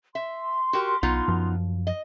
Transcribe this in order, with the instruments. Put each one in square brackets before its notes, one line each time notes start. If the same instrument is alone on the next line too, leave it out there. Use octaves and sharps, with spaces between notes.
[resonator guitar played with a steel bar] E5 [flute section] C6
[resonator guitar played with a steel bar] F#4 G4 A#4
[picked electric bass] B1 [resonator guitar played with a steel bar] B3 D#4 F4
[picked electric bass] F#2 F3
[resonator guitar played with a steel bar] D#5